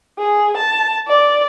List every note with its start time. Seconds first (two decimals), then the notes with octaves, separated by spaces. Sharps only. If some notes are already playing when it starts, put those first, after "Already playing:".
0.19 G#4
0.57 A5
1.08 D5